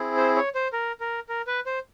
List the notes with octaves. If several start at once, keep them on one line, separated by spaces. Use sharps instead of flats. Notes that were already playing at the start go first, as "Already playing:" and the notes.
Already playing: C4 E4 G#4
C5
C#5
C5
A#4
A#4
A#4
B4
C5